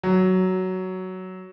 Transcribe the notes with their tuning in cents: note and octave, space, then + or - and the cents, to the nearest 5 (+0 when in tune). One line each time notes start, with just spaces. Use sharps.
F#3 +10